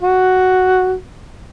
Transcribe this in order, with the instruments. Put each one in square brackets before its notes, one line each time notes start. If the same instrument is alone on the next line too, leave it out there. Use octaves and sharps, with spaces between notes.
[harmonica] F#4